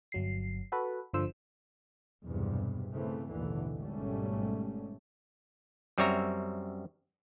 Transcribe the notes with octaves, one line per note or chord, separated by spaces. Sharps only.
G1 F#3 C7
F#4 A4 B4
G1 D3 F3 C5 E6
B1 E2 G2 C3
C#3 E3 A3 C4
A1 D#2 B2 D3 E3
G#1 G#2 B2 G3 A3 C#4
F#2 G3 C4 C#5 E5 A#5